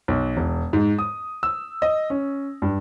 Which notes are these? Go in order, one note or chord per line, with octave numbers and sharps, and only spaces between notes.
B1
E1
G#2
D#6
E6
D#5
C#4
G2